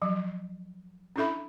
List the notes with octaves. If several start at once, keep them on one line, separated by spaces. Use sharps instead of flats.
F3 F#3
C#4 D4 E4 A4 E5 B5